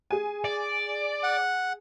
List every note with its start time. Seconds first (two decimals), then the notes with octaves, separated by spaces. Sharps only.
0.11 G#4 G#5
0.45 D5
1.23 F#5